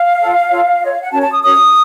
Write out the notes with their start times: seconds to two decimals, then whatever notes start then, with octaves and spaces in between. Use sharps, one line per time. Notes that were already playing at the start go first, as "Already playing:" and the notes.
Already playing: F5
0.19 F4 A4 C#5
0.50 F4 A4 C#5
0.81 F4 A4 C#5 D#5
0.91 F5
1.02 F#5
1.11 C#4 F#4 A#4 C#5 A5
1.22 A5
1.33 D#6
1.43 C#4 F#4 A#4 C#5 D#6